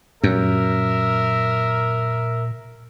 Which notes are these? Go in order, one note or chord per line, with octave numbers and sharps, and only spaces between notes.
F#2 A#2 A#4 E5